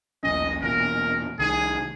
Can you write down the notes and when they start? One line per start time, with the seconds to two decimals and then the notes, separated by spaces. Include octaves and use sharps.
0.24 D#1 A#1 C#4 D#5
0.62 E1 E2 A#2 A#4
1.39 C2 D#3 G#4